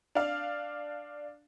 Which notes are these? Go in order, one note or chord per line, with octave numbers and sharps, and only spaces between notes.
D4 F5